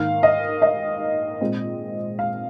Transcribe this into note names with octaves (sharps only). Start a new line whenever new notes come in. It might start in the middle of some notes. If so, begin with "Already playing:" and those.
Already playing: G#2 D#3 A#3 F5
D#5
D#5
A#2 G#3 C4
F5